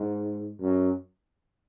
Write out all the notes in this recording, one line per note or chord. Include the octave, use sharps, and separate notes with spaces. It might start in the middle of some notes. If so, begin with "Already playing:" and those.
Already playing: G#2
F#2